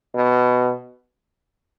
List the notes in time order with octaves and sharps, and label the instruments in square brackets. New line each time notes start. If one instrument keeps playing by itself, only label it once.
[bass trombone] B2